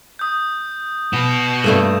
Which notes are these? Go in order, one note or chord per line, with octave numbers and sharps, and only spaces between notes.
D#6 G6
B3 F#4 E7
G2 A3 A#3